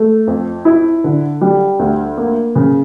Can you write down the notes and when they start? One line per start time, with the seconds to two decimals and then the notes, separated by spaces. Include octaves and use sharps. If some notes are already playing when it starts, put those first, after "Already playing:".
Already playing: A3
0.27 F2
0.65 E4
1.04 D3
1.41 G3
1.79 D2
2.18 A#3
2.55 C#3